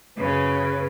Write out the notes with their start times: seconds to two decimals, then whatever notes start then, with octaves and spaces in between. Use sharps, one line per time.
0.18 F#2 C#3 B4